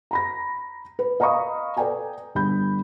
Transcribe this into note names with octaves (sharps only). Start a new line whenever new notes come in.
A#5 B5 A#6
B4
D#5 F5 A#5 B5 C#6 D#6
A4 B4 D5 G5 G#5 A#5
G1 B5 G6